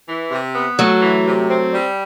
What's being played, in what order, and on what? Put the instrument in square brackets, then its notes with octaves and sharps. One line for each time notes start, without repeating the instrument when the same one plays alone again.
[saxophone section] E3
C3
B3
[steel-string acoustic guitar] F#3 A3 [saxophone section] F#4
[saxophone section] E3
C3
C4
G3